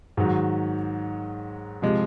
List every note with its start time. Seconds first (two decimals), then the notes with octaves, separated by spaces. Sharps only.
0.17 G#2 D#3 F#3
1.82 C3 F3 G#3